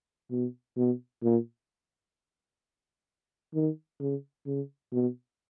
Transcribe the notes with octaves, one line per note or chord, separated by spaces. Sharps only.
B2
B2
A#2
D#3
C#3
C#3
B2